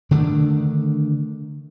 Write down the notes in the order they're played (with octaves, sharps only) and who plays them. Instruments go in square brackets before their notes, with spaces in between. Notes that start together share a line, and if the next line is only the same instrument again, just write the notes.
[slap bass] D3 D#3 A3 D4